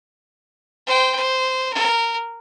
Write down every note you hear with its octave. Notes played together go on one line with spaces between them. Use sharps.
C5 G5
C5
A#4